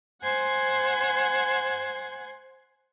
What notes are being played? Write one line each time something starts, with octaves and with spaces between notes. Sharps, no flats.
C5 F#5 G#5 G#6